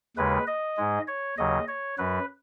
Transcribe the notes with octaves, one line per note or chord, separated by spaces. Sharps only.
D#2 C#3 G#3 B4
D#5
G#2 G#3
C#5
D#2 C#3 F#3 D#5
C#5
F#2 F#3 B4